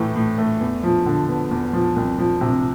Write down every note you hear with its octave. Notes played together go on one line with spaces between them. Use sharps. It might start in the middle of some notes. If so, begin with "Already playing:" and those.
Already playing: A2 E3 A3
A2
A3
E2
F3
D3
B3
E2
F3
C2
F3
C3